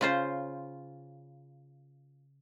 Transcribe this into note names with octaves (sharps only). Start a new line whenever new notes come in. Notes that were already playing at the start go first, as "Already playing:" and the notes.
C#3 F4 C5